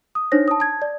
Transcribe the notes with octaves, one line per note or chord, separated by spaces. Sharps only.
D#6
D4 D#4 C5 C#5 A#6
A5 D#6
A5 G#6
D5